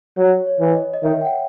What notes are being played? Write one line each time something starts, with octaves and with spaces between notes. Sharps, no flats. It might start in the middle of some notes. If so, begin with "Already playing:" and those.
F#3 C#5
C#5
E3
D#5
D#5
D#3 E5
G5
F#5